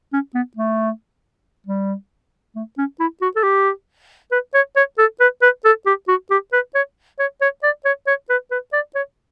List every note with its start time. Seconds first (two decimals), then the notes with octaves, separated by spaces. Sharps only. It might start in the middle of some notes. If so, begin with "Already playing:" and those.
0.13 C#4
0.35 B3
0.57 A3
1.67 G3
2.56 A3
2.78 C#4
3.00 E4
3.22 F#4
3.36 A4
3.43 G4
4.32 B4
4.54 C#5
4.76 C#5
4.98 A4
5.20 B4
5.42 B4
5.65 A4
5.86 G4
6.08 F#4
6.31 G4
6.53 B4
6.75 C#5
7.20 C#5
7.41 C#5
7.63 D5
7.85 C#5
8.07 C#5
8.30 B4
8.51 B4
8.73 D5
8.95 C#5